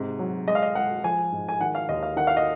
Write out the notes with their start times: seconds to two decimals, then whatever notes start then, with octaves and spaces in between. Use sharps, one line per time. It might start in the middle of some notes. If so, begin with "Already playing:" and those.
Already playing: G#2 C3
0.19 F#3
0.47 G#3 D#5
0.55 F5
0.62 D#5
0.75 G#3 F#5
1.04 F3 G#5
1.32 G#2
1.49 G#5
1.61 D#3 F#5
1.75 F5
1.89 D#2 D#5
2.03 F5
2.16 D#3 F#5
2.27 F5
2.37 D#5